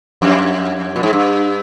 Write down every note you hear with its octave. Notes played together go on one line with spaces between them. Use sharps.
F2
A#2
G#2
G2